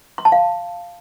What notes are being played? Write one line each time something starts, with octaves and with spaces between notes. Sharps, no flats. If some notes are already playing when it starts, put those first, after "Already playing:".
C6
A5
F5